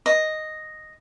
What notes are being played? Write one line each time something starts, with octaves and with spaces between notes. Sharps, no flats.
D#5